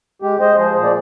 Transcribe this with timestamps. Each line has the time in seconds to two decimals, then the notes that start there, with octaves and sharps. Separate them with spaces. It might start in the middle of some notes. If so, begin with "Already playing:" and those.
0.22 G#3 G4
0.40 G#3 C5 D#5
0.57 F3 G#4 C5
0.74 A#2 C5
0.83 D5